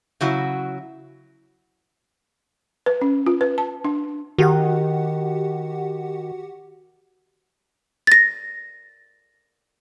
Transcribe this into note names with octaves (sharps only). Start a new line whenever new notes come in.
C#3 F#3 E4 F#4
B4
C#4
F4
B4
A5
D4
D#3 F#4 G4 F#5
A6 A#6